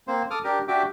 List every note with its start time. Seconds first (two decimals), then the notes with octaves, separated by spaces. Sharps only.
0.08 A#3 C4 C5
0.31 A4 D6 D#6 F6
0.44 D4 G4 A#4
0.68 D4 F#4 G4 E5 G5 D6